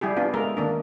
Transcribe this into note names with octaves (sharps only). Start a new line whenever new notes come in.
G3 E4 G4 G#4
B3 D4 F4
G#3 A3 A#4
D#3 A#3 D4